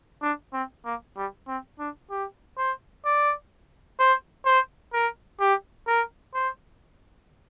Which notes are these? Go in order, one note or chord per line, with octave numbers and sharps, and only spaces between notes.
D4
C4
A#3
G3
C4
D4
G4
C5
D5
C5
C5
A#4
G4
A#4
C5